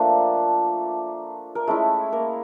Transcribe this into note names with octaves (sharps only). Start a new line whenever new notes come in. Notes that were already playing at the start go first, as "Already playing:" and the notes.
Already playing: F3 A3 A#3 D4 F4 A4
A#4
G#3 A3 C#4 E4 A4
A#3 A#4